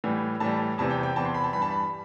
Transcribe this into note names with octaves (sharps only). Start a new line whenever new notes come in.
A2 E3 G3
A2 E3 G3 A5
E2 C3 E3 A5
G5
G5
E2 C3 E3 A5
C6
B5
A5
G2 E3 G3 B5
A5
B5